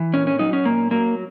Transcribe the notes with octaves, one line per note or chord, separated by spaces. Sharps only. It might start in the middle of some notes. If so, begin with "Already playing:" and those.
Already playing: E3
A#2 C#4
C#4
F#3 D#4
C#4
A#2 A#3
F#3 A#3